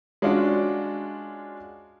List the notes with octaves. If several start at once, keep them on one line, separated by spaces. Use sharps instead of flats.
G#3 C#4 D4 F4 F#4 D5